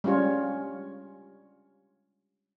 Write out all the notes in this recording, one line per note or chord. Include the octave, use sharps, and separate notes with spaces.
G3 G#3 C#4 F4 C#5